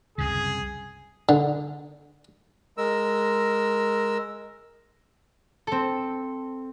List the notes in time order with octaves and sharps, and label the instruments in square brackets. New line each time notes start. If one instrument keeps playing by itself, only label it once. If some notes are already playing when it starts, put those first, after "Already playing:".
[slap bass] C2 F#2 C#3 [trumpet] G#4
[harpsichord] D3
[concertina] G#3 A#4 E6
[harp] C4 A4